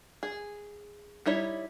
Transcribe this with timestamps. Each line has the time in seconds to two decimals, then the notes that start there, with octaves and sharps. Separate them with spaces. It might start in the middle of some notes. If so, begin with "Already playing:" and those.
0.23 G#4
1.26 G3 D#4 E4 C#5